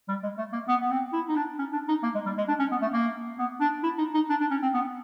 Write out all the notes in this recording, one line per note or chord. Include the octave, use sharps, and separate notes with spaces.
G3
G#3
A3
A#3
B3
B3
C4
E4
D#4
D4
C#4
D4
D#4
A#3
G#3
G3
G#3
D4
C#4
B3
A3
A#3
B3
D4
E4
D#4
D#4
D4
D4
C#4
C4
B3